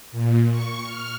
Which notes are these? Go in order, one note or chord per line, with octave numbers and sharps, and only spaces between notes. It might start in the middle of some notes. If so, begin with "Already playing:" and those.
A#2
C#6
F6